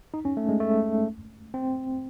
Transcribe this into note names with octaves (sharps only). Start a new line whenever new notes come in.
D#4
C#4
A3
G#3
A3
C4